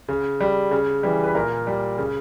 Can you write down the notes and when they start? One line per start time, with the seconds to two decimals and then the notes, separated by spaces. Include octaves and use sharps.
0.08 C#3
0.40 G3
0.71 C#3
1.03 E3 G3
1.24 B4
1.35 A#2 A#4
1.67 G3
1.98 C#3